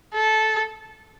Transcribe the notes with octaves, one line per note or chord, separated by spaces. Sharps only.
A4